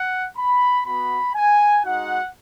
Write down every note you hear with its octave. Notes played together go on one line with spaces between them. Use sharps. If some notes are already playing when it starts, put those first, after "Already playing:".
Already playing: F#5
B5
B3 F#4 B5
G#5
G#3 D#4 F#4 F#5